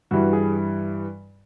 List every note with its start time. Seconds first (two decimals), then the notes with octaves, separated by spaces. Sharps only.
0.11 G2 E3 G3 F#4
0.33 G#4